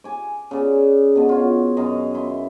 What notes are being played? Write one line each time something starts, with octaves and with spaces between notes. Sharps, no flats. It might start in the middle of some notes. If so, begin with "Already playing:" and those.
G#5 D6
C#3 D5
B2 D3
F4 C#5
F#2 D#3 D#5 F5
E4 C6